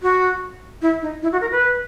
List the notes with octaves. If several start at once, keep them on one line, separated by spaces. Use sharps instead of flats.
F#4
E4
D#4
E4
F#4
A#4
B4